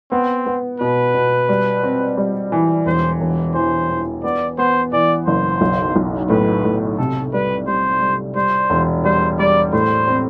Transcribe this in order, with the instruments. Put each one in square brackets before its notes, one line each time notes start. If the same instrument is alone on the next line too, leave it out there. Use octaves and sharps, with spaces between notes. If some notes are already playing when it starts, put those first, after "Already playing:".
[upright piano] B3 [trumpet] C4
[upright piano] B3
[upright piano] B2 [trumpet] B4
[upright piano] B2
G3
C4
G3
E3
[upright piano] E1 [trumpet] C5
[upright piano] E1
[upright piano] E3 [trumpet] C5
[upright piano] E3
[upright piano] B3 [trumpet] D5
[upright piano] B3 [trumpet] C5
[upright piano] E3 [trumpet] D5
[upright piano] F#1 [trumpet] C5
[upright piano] B1
B1
[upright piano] A2 [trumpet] B4
[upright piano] A2
[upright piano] C3 [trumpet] A4
[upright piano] G3 [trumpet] B4
[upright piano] G3 [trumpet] C5
[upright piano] G3
[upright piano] G3 [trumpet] C5
[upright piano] E1
[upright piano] G3 [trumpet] C5
[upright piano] G3 [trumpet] D5
[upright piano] A2 [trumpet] C5
[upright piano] C4